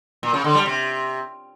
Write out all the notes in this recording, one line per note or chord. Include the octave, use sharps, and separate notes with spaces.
A#2
C#3
D3
G3
C3